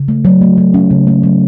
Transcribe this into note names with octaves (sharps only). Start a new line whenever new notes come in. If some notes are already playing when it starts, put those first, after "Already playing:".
Already playing: C#3
A3
F#3
A3
F#3
C#4
C#3
A3
F#3